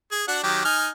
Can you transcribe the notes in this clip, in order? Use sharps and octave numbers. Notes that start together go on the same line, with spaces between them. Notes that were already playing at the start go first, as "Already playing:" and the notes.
G#4
D4 F#4 F#5
D#3 F#3 G4
D#4 G#5 F6